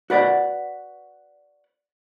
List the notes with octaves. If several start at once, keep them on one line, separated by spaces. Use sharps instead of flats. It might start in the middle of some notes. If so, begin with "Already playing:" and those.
F#4 B4 D5 F#5